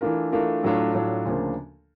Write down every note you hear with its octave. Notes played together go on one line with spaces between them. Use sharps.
E3 A3 D4 F4 A#4
E3 A3 D4 F4 A#4
A2 F#3 A3 D4 F4
A2 F#3 A3 D4 F4
D2 C#3 F3 A#3 D4